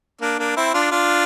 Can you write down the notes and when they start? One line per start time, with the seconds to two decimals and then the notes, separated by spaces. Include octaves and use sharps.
0.21 A#3 D4
0.39 A#3 D4
0.57 C4 E4
0.74 D4 F4
0.92 D4 F4